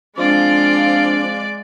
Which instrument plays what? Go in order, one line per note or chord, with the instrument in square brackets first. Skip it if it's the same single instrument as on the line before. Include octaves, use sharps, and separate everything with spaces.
[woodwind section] F3 C4 [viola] G#3 D5 [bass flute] D4 [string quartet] F4 F5